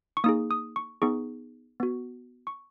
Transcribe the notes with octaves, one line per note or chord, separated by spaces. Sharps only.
C#6
A#3 D#4 G#4 D#6
D#6
C#6
B3 D#4 G#4 C#6
B3 F#4
C#6